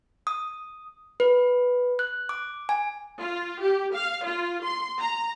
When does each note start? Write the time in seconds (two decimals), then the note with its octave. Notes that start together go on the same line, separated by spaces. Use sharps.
0.27 D#6
1.20 B4
1.99 F#6
2.29 D6
2.69 G#5
3.19 F4
3.61 G4
3.94 F5
4.25 F4
4.63 C6
5.00 A#5